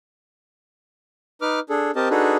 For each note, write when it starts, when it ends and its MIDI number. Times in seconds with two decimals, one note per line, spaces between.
1.42 1.60 63
1.42 1.60 71
1.42 1.60 86
1.42 1.60 89
1.70 1.91 62
1.70 1.91 68
1.70 1.91 69
1.96 2.09 60
1.96 2.09 67
1.96 2.09 70
1.96 2.09 75
1.96 2.09 81
2.10 2.37 62
2.10 2.37 63
2.10 2.37 66
2.10 2.37 68
2.10 2.37 69
2.10 2.37 71